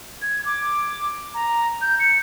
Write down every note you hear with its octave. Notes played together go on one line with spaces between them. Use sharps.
G#6
D6
A#5
G6
C#7